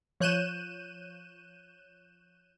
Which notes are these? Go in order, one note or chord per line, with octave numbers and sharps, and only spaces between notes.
F3 C#5 F#6 G6 D#7 E7